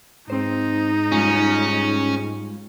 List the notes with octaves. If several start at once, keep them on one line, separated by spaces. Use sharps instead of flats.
G#2 C4 D#4 C5
G3 G#3 C#4 F4